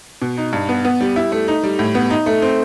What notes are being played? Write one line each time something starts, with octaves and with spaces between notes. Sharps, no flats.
B2
D#4
G2
B3
B3
G3
E4
A3
D#4
G3
A2
B3
D#4
A3
C4